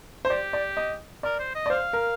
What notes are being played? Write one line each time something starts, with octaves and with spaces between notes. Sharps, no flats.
C5
G4 D5
D5
D#5
A#4 D5
C5
D#5
D5
C5 F5
A#4